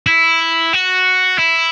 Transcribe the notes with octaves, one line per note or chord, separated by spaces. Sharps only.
E4
F#4
E4